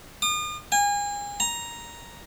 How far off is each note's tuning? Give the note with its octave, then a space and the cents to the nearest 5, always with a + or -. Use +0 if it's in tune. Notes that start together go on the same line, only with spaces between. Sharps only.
D#6 -45
G#5 -30
A#5 +5